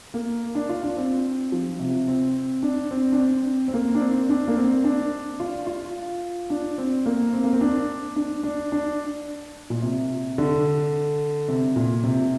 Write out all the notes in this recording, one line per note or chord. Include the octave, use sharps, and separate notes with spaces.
A#3
D4
F4
D4
C4
F3
C3
C4
D4
C4
D4
C4
C4
A#3
D4
C4
D4
A#3
C4
D4
F4
F4
D4
C4
A#3
C4
A#3
C4
D4
D4
D4
D4
A#2
C3
D3
C3
A#2
C3